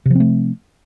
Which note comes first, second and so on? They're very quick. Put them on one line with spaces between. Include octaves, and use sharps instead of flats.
C3 F3 C4 A3